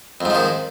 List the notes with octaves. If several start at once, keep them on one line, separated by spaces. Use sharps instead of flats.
F2 G#2 D#3 F3